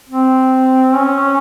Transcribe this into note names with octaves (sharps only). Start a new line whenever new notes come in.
C4
C#4